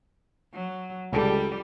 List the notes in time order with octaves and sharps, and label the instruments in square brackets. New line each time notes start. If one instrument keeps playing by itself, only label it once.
[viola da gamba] F#3
[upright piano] C#2 A4 [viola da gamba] G3